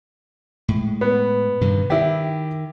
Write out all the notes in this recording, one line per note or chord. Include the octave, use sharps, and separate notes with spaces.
A2 G#3
B3
G2 C3 D#3
D#3 E4 G4